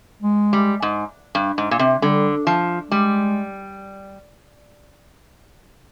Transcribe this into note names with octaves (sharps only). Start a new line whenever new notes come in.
G#3
G3
G#2
G2
G#2
A#2
C3
D3 G3
F3
G3 G#3